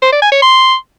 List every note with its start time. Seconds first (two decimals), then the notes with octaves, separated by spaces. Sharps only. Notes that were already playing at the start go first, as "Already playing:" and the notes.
0.02 C5
0.12 D5
0.22 G#5
0.32 C#5
0.42 C6